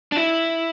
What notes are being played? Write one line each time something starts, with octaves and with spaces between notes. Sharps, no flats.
D4
E4